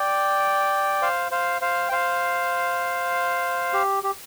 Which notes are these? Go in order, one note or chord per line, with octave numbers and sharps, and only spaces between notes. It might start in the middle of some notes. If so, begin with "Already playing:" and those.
Already playing: D5 G5
C5 F5
C5 F5
C5 F5
G5
C5 F5
G4
G4